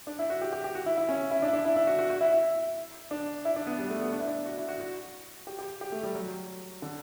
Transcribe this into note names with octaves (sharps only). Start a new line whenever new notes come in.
D4
E4
F#4
G4
G4
G4
F#4
E4
E4
C#4
E4
D4
E4
D4
E4
E4
F#4
F#4
F#4
E4
E4
D4
E4
D4
B3
G3
A3
B3
D4
E4
D4
F#4
E4
F#4
F#4
G4
G4
G4
A3
G3
F#3
D3